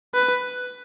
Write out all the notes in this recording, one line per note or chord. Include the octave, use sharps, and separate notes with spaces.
B4